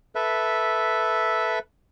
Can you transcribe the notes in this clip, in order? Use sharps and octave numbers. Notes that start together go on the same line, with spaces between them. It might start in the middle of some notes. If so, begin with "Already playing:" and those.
A4 B4 E5